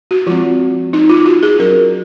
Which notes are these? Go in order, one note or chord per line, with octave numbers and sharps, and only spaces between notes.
F#4
F3 G#3 C4 F4
D#4
F4
F#4
G#4
F#3 C#4 A#4